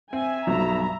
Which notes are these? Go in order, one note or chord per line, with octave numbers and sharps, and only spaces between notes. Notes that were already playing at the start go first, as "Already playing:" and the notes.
C4 E5 G#5
B1 G2 B2 F3 A#5